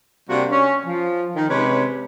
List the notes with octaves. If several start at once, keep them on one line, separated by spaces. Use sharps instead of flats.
C3 G3 A#3 D4 F#4
C#4
F3
D#3
C3 G#3 C#4 B4 C#5